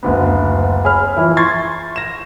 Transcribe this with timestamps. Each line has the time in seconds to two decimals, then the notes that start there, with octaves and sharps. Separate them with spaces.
0.03 F#1 D2 B3
0.85 G#4 C#5 B5 F6
1.16 E3 F3 E4
1.37 C6 C#6 G#6 A6 C7
1.96 A#6 E7